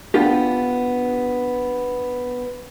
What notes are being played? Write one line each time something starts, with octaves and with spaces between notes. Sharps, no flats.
B3 D4 F4 G4